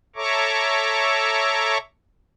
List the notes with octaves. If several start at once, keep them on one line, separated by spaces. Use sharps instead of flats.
A4 C#5 E5 A#5 C#6 D6